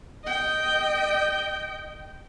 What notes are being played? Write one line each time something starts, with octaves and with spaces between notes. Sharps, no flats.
D#5 G5